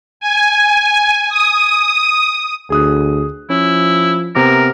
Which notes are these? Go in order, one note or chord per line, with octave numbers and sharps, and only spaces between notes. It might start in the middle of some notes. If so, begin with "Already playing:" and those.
G#5
D#6
D2 G#4 D#6 F#6
F3 C#4 E4
C3 B3 A#4 D6